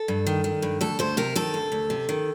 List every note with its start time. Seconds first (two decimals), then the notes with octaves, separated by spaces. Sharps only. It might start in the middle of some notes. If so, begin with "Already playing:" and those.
Already playing: A4
0.08 G2
0.27 D#3
0.44 D#3
0.62 G2
0.81 D2 A4
0.99 D2 C5
1.17 C3 A#4
1.35 D#3 A4
1.54 D2
1.72 D2
1.90 C3
2.09 D#3